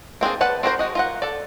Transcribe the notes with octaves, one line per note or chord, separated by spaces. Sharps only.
A#3 C4 D4 G#4
B4 D5 F#5 A5
C4 F#4 A#4 C5
G#3 F#4 D#5
F4 A#4 F#5
A4 D5